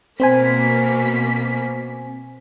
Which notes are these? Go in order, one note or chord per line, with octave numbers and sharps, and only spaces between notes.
B2 A#3 C4 C5 G#5 B6